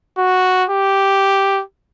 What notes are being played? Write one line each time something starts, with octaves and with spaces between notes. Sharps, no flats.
F#4
G4